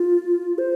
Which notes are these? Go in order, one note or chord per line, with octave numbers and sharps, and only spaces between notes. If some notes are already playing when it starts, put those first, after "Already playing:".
Already playing: F4
C5